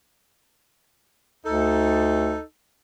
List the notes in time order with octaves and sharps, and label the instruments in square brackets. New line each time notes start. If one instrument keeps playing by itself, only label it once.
[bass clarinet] D2 [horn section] D#4 A4